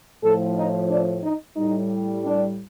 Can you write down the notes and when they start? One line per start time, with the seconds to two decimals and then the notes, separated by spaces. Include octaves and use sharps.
0.23 A2 F3 A4
0.57 D#4
0.90 D4
1.23 D#4
1.56 A2 G3 D#4
2.23 D4